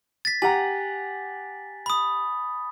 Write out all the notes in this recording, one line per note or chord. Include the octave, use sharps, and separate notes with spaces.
A6 B6
G4 F#5 G#5 A#5
B5 D#6